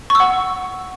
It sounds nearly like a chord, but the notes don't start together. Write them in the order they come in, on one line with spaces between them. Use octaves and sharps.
C#6 E6 F#5